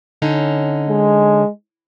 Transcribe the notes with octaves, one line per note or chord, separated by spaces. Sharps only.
D3 C#4 D#4
G#3